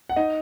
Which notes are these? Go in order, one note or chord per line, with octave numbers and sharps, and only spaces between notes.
F#5
D#4 D#5